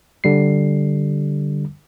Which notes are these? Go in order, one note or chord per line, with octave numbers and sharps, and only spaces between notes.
D3 G3 C7